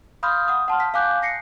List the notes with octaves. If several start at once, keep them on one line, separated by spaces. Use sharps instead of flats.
F5 B5 C6 D#6 F6 G6
F#5 D#6
F#5 A5 C6 F6
B6
F5 G#5 D6 F#6 G6
A#6 C7 C#7